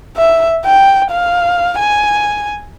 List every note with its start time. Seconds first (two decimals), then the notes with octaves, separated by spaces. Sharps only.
0.17 E5
0.65 G5
1.11 F5
1.79 G#5